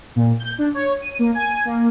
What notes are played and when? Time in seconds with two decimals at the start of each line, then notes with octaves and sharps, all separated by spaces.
0.16 A#2
0.39 G6
0.58 D4
0.74 C#5
1.02 D#7
1.19 A#3
1.35 G#5
1.65 A#3